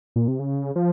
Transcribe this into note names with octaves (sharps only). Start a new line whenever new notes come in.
A#2
C3
C#3
F3